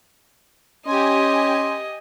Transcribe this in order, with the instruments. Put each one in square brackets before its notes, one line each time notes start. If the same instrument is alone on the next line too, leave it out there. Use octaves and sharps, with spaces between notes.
[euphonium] C#4 [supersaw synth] G4 G#5 [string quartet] D#5 [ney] C6